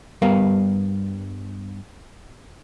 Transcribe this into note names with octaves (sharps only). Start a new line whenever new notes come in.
G2 G3 B3 A#4 B4 F5